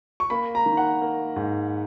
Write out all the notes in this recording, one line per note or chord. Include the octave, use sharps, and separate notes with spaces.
C#6
A#3 B5
A#5
D#3
F#5
A#3
G#2